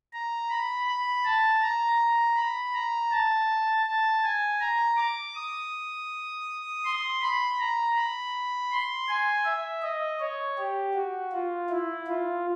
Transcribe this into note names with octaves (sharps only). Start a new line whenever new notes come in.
A#5
B5
B5
A5
A#5
B5
A#5
A5
A5
G#5
A#5
D6
D#6
C6
B5
A#5
B5
C6
G#5
E5
D#5
C#5
G4
F#4
F4
E4
F4